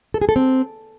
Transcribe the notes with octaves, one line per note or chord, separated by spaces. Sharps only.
A4
G#4
A4
C4